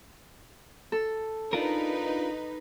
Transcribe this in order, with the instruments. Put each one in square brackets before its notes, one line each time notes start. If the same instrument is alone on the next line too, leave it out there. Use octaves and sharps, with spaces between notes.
[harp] A4
[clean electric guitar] D4 F4 A#4 [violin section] D#4 B4